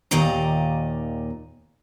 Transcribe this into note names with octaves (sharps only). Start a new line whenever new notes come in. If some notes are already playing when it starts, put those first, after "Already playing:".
D#2 A#2 D#3 D5 D#5 A#5